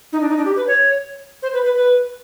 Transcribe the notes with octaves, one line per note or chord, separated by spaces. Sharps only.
D#4
D4
D#4
D4
G4
B4
C#5
C5
B4
B4
B4